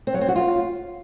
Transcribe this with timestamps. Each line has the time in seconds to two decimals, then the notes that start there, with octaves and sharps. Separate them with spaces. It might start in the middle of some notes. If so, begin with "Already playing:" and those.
0.07 C4
0.14 F#3
0.21 C4
0.28 F#4
0.36 F4